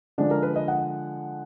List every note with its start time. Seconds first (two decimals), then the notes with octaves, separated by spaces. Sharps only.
0.18 D3 F3 G#3 D4
0.31 A#4
0.43 B4
0.56 D#5
0.68 F#5